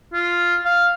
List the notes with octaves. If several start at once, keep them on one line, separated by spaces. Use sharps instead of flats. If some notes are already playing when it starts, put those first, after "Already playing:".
F4
F5